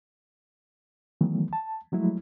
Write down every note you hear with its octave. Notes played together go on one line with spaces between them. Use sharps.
D#3 E3 F#3 A3 B3
A5
F3 F#3 G#3 A3 E4